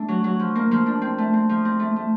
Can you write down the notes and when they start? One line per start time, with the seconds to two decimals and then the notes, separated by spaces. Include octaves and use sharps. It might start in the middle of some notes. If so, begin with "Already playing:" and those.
Already playing: A3 D4
0.08 F#3
0.24 F#3
0.39 F3
0.55 A#3
0.71 F3
0.86 D4
1.02 C4
1.18 A3
1.33 C4
1.49 F3
1.65 C4
1.80 A3
1.96 A3